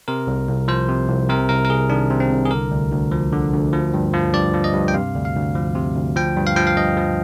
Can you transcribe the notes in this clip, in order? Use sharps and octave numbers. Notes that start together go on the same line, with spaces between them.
C3 A#4
C2
C2
F3 C5
C3
C2
C3 A#4
C2 A#4
A#4
C2 G#4
D#3 D4
C3
C4
C2
G#4
D3 A#4
D2
D2
F3
D3
D2
F3
G2
F3
G2 D5
F3
D#5
G2
G5
C3 F5
D2
F5
D2
F3
C3
D2
F3 G5
G2
F5
F3 G5
F5
G2 D#5
F3